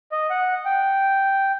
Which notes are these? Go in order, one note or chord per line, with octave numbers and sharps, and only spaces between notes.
D#5
F#5
G5